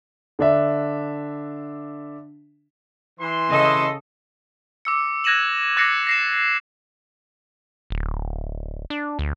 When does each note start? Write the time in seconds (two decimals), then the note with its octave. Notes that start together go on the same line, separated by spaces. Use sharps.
0.39 D3 D4 E5
3.20 E3 C6
3.49 C#3 A4 D#5
4.85 D6 E6 C#7
5.24 F#6 G#6 A#6 D#7 E7 F#7
5.77 D6 F#6 A6 A#6 C7 C#7
6.07 A#6 C7 E7
7.90 D1
8.90 D4
9.19 D2